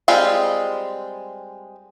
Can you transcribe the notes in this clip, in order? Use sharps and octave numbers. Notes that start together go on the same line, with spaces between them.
G3 G#3 C4 F4